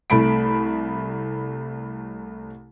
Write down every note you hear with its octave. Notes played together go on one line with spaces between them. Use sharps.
C2 A3 B5 D7